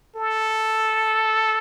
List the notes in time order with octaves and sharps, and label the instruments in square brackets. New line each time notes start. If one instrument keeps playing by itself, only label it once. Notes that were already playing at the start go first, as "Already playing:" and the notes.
[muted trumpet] A4